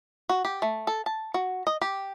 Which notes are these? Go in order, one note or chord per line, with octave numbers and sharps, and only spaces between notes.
F#4
G4
A3
A4
A5
F#4
D#5
G4